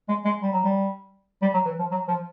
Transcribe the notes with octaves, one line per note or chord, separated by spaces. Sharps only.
G#3
G#3
G3
F#3
G3
G3
F#3
E3
F3
F#3
F3